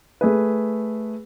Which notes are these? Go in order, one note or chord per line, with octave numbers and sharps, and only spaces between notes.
A3 G#4 B4